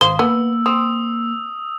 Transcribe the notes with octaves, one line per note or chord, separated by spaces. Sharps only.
G#1 C5 F5 D#6 G7
A#3 B3 E6
C4 D#6